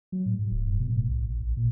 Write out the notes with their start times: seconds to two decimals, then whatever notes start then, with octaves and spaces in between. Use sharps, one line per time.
0.12 F#3
0.26 A2
0.39 G#2
0.51 D1
0.67 G2
0.80 B2
0.92 A2
1.08 B1
1.21 A#1
1.41 A1
1.57 A#2